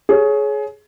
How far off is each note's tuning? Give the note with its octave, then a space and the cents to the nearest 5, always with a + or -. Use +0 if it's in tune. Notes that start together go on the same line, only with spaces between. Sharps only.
G#4 +25 C#5 +0